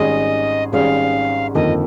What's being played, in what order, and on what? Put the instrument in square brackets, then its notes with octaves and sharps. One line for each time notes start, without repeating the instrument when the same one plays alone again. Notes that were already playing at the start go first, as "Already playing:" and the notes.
Already playing: [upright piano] G#1 G#2 G3 C#4 G#4 [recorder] D#5
[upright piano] G#1 G#2 G3 C#4 G#4 [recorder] F5
[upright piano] G1 F2 D#3 A#3 [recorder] D#5